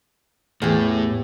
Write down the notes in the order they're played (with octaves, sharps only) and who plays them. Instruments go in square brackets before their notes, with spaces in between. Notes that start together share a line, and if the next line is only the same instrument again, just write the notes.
[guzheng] E2 G4 [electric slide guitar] A2